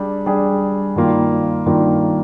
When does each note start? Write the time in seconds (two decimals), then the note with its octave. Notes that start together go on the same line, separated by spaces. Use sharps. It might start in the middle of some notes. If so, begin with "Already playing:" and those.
Already playing: G3 D4 G#4
0.26 G3 D4 G#4
0.96 G2 D#3 A#3 F4
1.66 G2 D#3 A#3 F4